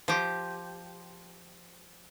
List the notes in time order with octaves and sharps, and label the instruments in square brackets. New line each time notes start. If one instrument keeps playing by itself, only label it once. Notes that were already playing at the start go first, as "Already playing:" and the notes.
[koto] F3 G4